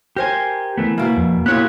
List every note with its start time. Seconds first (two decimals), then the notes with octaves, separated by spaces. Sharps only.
0.16 G4 A#4 C5 G#5
0.78 E3 A3 B3
0.98 B2 A#3 E4
1.17 F2
1.46 A#2 B3 E4 G4 C#5 F#6